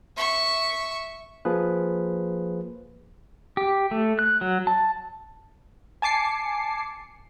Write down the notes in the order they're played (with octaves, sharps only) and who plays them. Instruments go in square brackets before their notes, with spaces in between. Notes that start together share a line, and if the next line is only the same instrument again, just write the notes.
[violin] E5 C#6
[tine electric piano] F3 A#3 G#4 B4
[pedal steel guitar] G4
A3
F#6
F#3
A5
[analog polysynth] G#5 A5 D6 C7 C#7